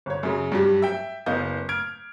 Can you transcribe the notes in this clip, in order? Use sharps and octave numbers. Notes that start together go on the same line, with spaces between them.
G1 C#5
F#2 C#3
G2 F#3 G3
E5 G5
F#1 B3 D#5 F5 G6
F6 G#6 D7